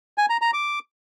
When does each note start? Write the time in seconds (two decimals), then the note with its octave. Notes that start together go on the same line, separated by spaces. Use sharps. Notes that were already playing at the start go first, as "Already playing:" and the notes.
0.18 G#5
0.30 A#5
0.42 A#5
0.53 D6